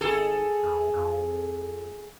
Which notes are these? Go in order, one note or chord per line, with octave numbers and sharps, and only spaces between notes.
G#1 G#4 A4
E2
F2